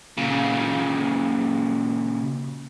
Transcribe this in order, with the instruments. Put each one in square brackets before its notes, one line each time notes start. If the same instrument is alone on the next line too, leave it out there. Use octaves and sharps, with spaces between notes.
[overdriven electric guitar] A#2 C#3